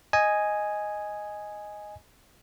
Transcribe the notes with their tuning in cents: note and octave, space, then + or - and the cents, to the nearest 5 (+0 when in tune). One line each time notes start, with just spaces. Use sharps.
D#5 +0 G#5 +0